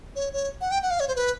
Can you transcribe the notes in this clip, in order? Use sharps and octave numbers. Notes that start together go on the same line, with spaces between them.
C#5
C#5
F#5
G5
F#5
F5
C#5
C5
B4